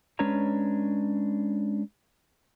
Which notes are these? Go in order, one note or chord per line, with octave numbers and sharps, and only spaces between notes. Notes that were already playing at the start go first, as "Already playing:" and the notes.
G#3 C#4 D4 B4 C#5 A#5